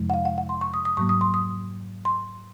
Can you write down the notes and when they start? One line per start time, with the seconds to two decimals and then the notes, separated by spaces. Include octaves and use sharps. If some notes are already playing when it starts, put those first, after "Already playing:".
Already playing: F2 C3 F3 G#3
0.10 F#5
0.14 F5
0.25 F#5
0.38 F#5
0.49 C6
0.61 C#6
0.74 D#6
0.85 D#6
0.97 G#2 F#3 A#3 C#6
1.09 D#6
1.21 C6
1.34 D#6
2.05 C6